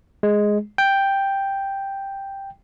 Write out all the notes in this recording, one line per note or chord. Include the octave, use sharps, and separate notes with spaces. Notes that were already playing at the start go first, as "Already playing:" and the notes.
G#3
G5